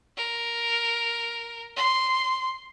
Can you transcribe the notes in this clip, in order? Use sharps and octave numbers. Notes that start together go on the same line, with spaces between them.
A#4
C6